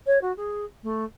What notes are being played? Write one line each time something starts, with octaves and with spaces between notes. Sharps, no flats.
C#5
F#4
G#4
A3